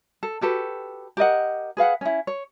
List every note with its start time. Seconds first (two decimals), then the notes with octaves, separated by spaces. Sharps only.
0.23 A4
0.41 F#4 G4 A4 B4
1.17 G4 A#4 D#5 F#5
1.77 G#4 B4 F5 F#5
2.01 C#4 E4
2.27 C#5